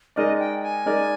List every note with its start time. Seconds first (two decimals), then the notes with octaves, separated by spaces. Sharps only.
0.16 G#3 D#4 A#4 D5 D#5
0.39 G5
0.62 G#5
0.86 G#3 D#4 A#4 D5